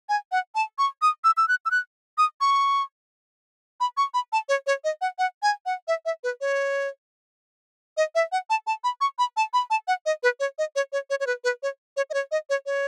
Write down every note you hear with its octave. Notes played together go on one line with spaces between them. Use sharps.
G#5
F#5
A5
C#6
D#6
E6
E6
F#6
E6
F#6
D#6
C#6
B5
C#6
B5
A5
C#5
C#5
D#5
F#5
F#5
G#5
F#5
E5
E5
B4
C#5
D#5
E5
F#5
A5
A5
B5
C#6
B5
A5
B5
A5
F#5
D#5
B4
C#5
D#5
C#5
C#5
C#5
C#5
B4
B4
C#5
C#5
D#5
C#5
D#5
C#5
C#5